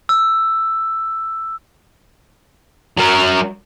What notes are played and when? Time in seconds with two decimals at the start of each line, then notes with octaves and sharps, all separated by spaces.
0.09 E6
2.98 F#3 A#4